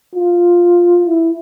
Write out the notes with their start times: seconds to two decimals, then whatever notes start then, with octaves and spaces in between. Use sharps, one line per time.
0.16 F4
1.06 E4